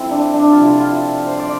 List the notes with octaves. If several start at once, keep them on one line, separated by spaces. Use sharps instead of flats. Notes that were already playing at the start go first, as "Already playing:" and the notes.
Already playing: F3 A3 C4 E4
D4
D4
F4
C3 F3 A3 E4
F4
C5
D5